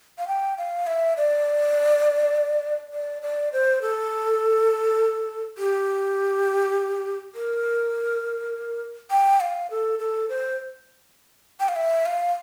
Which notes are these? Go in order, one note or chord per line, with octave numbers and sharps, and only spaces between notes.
F5
G5
F5
E5
D5
D5
D5
C5
A4
G4
A#4
G5
F5
A4
A4
C5
G5
F5
E5
F5